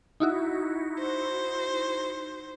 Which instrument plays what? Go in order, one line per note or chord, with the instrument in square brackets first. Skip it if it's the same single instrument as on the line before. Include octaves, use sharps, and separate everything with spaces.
[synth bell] D#4 E4 F#4
[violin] C5